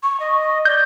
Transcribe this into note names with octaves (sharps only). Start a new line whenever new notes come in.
C#6
D#5
D5 G6